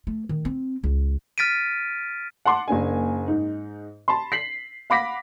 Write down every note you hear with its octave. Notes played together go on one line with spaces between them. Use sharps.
A3
D#3
C4
C#2
F6 A6 B6 D7 D#7
F#5 A5 C6 D6
F#1 A#3 D4 G#5
G#2 D#4
A5 B5 C6
B6 C7 F#7
F5 F#5 B5 D6 A#6 B6